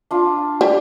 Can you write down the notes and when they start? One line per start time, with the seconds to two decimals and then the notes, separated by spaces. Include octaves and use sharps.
0.11 D4 F4
0.61 G3